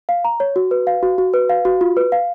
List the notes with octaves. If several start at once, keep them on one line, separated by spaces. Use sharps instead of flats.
F5
A#5
C#5
F#4
B4
F5
F#4
F#4
B4
F5
F#4
F4
B4
F5